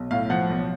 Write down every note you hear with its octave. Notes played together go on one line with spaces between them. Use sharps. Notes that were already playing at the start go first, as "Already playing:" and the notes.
Already playing: B1
A2 F5
F3 F#5
B1